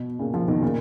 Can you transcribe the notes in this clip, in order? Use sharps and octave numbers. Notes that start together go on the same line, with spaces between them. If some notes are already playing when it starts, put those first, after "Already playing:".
Already playing: B2
A#2 C#3
C#3 F3
B2 D#3
A#2 C#3